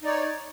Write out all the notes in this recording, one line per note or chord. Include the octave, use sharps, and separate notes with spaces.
D#4 C#5 D5